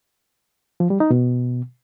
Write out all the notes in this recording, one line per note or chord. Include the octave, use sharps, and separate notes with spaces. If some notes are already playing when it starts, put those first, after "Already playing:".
F3
G3
D#4
B2